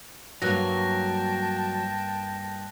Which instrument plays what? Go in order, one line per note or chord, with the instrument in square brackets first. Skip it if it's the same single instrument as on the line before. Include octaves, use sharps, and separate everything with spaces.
[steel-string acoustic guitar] G2 A#3 [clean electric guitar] F#3 [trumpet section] G5 A5 [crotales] F#6 A#6